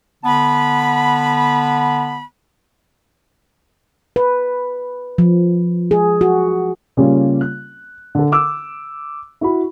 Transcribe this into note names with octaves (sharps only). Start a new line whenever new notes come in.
D3 B3 A5 B5
B4
F3
G#4
F#4
C#3 G3 A#3 C#4 F4
F#6
D3 A4
D6 E6
E4 F#4 B5